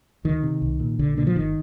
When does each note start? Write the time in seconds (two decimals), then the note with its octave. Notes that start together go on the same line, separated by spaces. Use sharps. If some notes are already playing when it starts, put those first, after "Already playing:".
0.24 D2 D#3
0.43 C3
0.62 C2
0.80 A#2
0.99 A#1 D3
1.17 A#2 D3
1.27 F3
1.35 G1 D#3